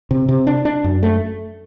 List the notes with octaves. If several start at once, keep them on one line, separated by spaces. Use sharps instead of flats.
C3
C3
D4
D4
F#2
A3